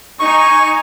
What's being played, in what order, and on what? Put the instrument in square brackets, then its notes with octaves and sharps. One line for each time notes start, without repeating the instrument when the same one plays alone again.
[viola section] D#4 G#5 [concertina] C#6